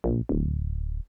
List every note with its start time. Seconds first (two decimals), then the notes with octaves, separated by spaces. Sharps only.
0.04 A#1
0.29 D1